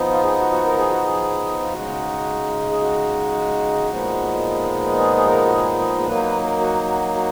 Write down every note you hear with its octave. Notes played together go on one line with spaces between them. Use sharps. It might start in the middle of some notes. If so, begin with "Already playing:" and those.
Already playing: F3 B3 D#4
F4
G#4
F#4
F#4
A#4
G#4
F#4
G#4
F4
C#3 G#3 D#4 F#4
G#4
F#4
A#2 F3 G#3 B3 D#4
G#4
G#4
A#4
F#4
G#4
G#4
F#3 A#3 D#4 B4
B4
A#4
F#4
F#4
F#4